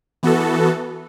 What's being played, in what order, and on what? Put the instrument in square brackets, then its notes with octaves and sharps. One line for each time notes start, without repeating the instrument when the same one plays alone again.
[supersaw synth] E3 B3 F#4 A4